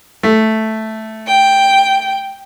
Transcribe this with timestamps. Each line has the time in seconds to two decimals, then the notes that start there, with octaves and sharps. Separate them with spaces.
0.23 A3
1.26 G5